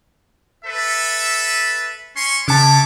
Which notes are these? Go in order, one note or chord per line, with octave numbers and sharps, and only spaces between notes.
A4 B4 E5
C#4 C6 C#6
C#3 C#5 E5 A5 D6